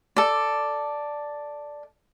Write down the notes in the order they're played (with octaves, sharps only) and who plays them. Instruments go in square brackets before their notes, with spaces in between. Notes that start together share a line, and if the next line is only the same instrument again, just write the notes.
[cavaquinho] A4 D5